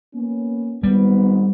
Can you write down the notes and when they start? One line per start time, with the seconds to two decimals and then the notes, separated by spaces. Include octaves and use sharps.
0.15 A#3 B3 C#4
0.83 G#1 G#2 G3 B3